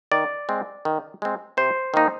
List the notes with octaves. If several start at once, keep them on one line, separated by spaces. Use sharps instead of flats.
D#3 D5
G#3 C4
D#3
G#3 C4
C3 C5
D#3 A#3 D#4